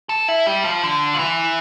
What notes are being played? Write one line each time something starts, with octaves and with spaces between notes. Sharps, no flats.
A4
E4
G3
F3
D3
F3
E3